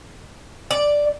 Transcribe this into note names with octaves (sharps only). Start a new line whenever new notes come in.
D5